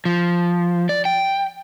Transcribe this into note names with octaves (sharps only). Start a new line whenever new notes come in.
F3
D5
G5